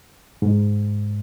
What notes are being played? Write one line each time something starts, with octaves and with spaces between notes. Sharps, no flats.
G#2